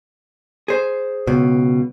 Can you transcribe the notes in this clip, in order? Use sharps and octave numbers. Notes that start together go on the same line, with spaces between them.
G#4 C5
C#2 B2